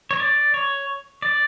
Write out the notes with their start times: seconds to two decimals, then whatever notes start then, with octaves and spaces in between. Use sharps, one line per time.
0.11 C#5
0.20 D5
0.54 C#5
1.22 D5